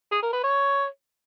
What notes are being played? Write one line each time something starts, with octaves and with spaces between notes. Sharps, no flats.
G#4
A#4
B4
C#5